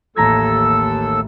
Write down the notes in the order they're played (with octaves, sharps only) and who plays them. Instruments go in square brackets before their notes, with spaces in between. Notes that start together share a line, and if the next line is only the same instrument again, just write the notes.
[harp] A1 A#5 G#6 [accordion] D#2 A4 E6